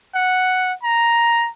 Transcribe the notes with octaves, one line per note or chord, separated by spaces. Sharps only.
F#5
A#5